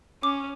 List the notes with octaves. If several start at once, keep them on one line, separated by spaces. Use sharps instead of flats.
C#4 D6